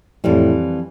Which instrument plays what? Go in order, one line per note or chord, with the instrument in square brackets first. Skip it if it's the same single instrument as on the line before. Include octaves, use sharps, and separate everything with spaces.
[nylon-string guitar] F2 E3 G3 [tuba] A2